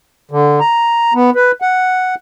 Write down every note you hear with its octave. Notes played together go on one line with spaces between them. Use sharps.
D3
A#5
B3
B4
F#5